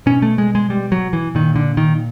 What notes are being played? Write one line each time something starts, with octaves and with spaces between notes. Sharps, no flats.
B2 C#4
A3
G#3
G#3
G3
F#3
E3
A#2 D#3
D3
D#3